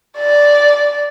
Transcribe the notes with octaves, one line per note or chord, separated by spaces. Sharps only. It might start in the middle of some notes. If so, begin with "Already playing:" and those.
D5